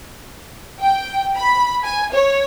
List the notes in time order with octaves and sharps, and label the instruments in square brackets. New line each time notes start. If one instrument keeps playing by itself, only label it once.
[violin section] G5
B5
G#5
C#5